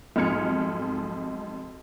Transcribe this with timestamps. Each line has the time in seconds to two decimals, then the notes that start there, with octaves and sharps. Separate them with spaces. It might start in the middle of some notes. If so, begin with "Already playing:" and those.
0.16 B1 F2 G#2 F6 G#6 C#7